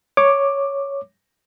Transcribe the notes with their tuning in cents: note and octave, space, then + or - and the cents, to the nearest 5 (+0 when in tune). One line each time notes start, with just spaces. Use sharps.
C#5 +0 D6 +10